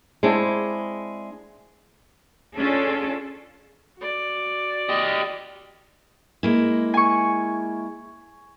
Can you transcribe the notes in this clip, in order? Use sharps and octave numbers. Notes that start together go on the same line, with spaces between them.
G#3 C4 D4 E4
C#4 D4 F4 G#4 A4
F#4 D5
G4 D#5
G#3 A#3 E4
G#5 C#6